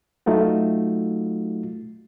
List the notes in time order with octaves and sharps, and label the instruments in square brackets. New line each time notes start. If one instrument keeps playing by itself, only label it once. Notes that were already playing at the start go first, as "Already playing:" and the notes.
[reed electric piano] F#3 A3 D#4 F4 F#4